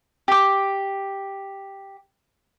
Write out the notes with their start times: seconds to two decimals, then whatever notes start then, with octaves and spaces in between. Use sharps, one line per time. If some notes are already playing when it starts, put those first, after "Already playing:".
0.28 G4 D6